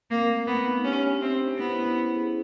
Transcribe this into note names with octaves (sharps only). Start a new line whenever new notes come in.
A#3 C4
A3
A3 B3
D#4
C#4 G4
D4
C4 E5
C5
B3 E4
C#4
C#5
G#4